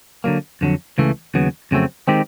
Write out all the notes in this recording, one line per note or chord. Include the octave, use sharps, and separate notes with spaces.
D3 F#3 A#3
F2 D3 F#3
C#2 C#3 E3 A3
D#2 C#3 F#3 B3
F2 C#3 F#3 A3 C4
D#3 G#3 C4 D#4 G4